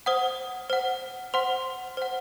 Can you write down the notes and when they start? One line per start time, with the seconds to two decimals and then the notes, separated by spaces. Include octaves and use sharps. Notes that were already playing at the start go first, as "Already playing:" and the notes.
0.06 C5 F#5 D#6
0.70 C5 F#5
1.34 C5 F#5 C6
1.97 C5 F#5